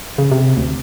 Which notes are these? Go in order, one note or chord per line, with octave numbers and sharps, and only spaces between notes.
C#3
C3
D2